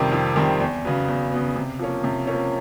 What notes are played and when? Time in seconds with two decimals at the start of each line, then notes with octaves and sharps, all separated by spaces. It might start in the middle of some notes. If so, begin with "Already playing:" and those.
Already playing: F2 C3 D#3 G3 C4
0.12 F2
0.36 C3 D#3 G3 C4
0.60 E2
0.85 C#3 F#3 B3
1.08 E2
1.32 C#3 F#3 B3
1.56 C3
1.79 F3 A#3 C#4
2.04 C3
2.27 F3 A#3 C#4